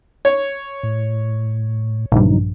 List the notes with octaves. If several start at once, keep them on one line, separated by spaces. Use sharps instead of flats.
C#5
A2
A#1 G2 C#3 F#3 D#4